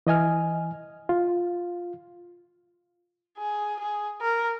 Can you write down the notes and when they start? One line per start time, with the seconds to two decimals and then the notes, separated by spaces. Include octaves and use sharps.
0.07 E3 D#5 G#5 F6
1.09 F4
3.38 G#4
3.79 G#4
4.21 A#4